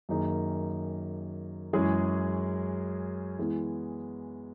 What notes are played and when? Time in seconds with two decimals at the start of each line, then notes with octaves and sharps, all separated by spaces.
0.09 F#2 D#3 A#3 D#4 G#4
1.73 F#2 E3 G#3 C#4 G#4
3.39 E3 G#3 B3 E4